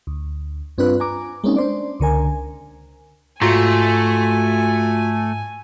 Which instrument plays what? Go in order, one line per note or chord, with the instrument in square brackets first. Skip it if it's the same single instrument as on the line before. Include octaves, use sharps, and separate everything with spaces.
[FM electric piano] D2
G2 C4 D4 F4 B4 F#6
G#5 A#5 D6
G#3 A#3 C4 C#4 D#4
D4 C5 D5
C#2 D3 A#4 G#5
[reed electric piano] G#2 [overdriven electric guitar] A3 [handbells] F4 F#4 A#5 [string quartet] G#5